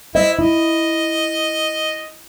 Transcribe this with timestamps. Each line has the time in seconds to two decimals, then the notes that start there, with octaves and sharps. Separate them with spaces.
0.15 E4 C5 D#5 E5
0.39 E4 D#5